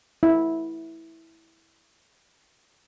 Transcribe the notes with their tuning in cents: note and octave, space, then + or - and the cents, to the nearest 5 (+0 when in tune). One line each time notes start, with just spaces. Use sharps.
E4 -10